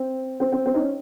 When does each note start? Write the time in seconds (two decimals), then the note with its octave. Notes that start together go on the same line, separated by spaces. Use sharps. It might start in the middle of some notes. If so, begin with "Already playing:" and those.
Already playing: C4
0.40 C4
0.52 C4
0.66 C4
0.74 D#4
0.78 C#4